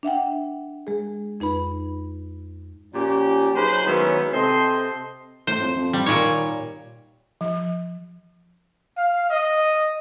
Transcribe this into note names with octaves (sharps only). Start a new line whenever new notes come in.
D4 E5 F#5 G5
G#3 G#4
F2 D#4 B4 B5
A#2 F3 C#4 G4
F#3 D#4 G#4 B4 C5
D#3 F#3 G#3 B3 C#4 E4
C3 C4 A4 C5 D#5 C6
A2 C5
F2
F2
G3
A#2 D#3 C#5
F3
F5
D#5